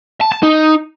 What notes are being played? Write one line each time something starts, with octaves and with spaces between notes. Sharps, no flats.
A5
A5
D#4